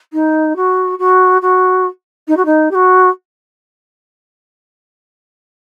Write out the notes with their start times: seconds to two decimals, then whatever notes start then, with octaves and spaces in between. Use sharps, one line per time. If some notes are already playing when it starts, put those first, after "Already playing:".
0.13 D#4
0.56 F#4
0.99 F#4
1.42 F#4
2.28 D#4
2.37 F#4
2.45 D#4
2.71 G4
2.75 F#4